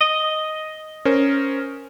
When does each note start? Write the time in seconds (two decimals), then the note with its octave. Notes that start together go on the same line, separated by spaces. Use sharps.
0.01 D#5
1.05 C#4 A#4 C5